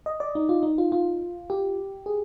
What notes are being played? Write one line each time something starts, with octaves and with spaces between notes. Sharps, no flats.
D#5
D5
D#4
F4
D#4
F4
F4
G4
G#4